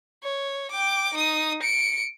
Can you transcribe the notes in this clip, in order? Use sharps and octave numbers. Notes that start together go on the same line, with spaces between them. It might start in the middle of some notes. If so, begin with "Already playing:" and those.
C#5
G5 D6
D#4 D#6
C#7 D7